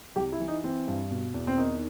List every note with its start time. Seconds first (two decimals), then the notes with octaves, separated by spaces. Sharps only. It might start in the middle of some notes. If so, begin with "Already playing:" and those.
0.16 C2 G4
0.32 E4
0.40 E3
0.48 D#4
0.64 E3 C4
0.88 G2
1.10 B2
1.34 E2
1.47 C4
1.57 D#3 D#4